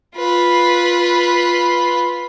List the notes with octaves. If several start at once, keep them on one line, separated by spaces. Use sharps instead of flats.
F4 B4